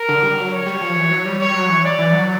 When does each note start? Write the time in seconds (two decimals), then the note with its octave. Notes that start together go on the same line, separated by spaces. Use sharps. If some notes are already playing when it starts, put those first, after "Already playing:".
Already playing: A#4
0.09 D3
0.23 G3
0.37 F#3
0.53 C#5
0.66 G3
0.81 F3
0.96 E3
1.11 F#3
1.25 G3
1.40 G3 C#5
1.54 F#3
1.69 E3
1.84 D5
1.98 E3
2.13 F#3